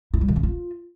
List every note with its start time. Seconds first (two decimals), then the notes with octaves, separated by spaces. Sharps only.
0.14 E4
0.21 G3
0.28 D#3
0.36 C#4
0.43 F4